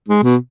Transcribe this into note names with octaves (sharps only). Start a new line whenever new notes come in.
G#3
B2